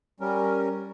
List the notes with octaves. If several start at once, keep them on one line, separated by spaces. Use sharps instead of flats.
G3 C#4 A#4